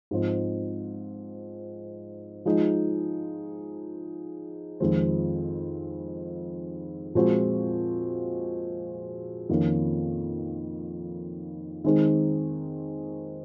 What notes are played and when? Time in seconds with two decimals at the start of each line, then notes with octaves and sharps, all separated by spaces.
0.11 G#2 F3 C4
2.45 F3 G#3 D#4
4.80 F2 D#3 G#3 C4
7.15 A#2 F3 G#3 C4 F#4
9.49 F2 D#3 A#3 C#4
11.84 D#3 G#3 C4 D#4